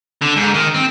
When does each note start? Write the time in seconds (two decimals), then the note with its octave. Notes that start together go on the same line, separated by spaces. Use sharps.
0.22 D3
0.36 G#2
0.54 D#3
0.74 C4